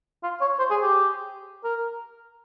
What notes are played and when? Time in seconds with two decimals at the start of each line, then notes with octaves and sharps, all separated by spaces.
0.23 F4
0.41 C#5
0.59 C5
0.70 G#4
0.82 G4
1.64 A#4